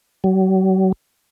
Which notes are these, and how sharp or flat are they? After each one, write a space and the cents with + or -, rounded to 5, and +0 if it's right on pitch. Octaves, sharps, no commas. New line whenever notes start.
F#3 +40